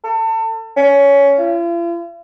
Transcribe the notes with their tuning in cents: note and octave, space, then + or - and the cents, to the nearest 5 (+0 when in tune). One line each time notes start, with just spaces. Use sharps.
A4 +30
C#4 +15
F4 -45